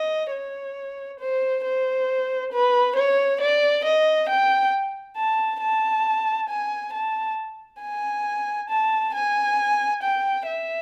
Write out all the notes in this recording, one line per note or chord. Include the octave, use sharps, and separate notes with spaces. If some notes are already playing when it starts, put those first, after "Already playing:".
Already playing: D#5
C#5
C5
C5
B4
C#5
D5
D#5
G5
A5
A5
G#5
A5
G#5
A5
G#5
G5
E5